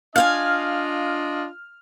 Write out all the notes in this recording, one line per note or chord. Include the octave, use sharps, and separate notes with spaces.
D4 F4 D#5 F5 G5 G#5 F6